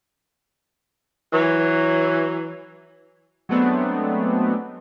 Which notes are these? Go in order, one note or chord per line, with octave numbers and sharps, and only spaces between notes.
E3 F#3
F#3 G#3 A3 B3 C4 D4